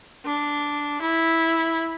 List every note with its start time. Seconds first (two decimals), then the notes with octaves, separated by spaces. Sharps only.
0.25 D4
1.01 E4